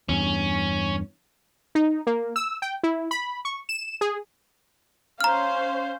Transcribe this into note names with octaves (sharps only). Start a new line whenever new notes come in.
E2 G2 C#4
D#4
A#3
E6
G5
E4
B5
C#6
E7
G#4
C#4 C5 F5 A#5 F6